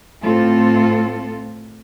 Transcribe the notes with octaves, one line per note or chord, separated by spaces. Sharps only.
A2 A3 C4 F4 A4